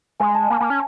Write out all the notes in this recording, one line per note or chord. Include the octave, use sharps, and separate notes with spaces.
G#3 G#5
A5
A#3
A#3
C#4